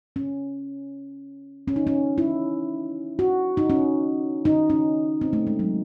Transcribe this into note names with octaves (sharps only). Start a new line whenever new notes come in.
C#4
C#4
D#4
C#4
E4
F#4
D#4
C#4
D#4
C#4
C4
A3
G#3
F#3